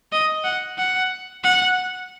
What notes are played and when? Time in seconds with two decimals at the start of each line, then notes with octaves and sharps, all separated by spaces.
0.12 D#5
0.44 F#5
0.78 F#5
1.44 F#5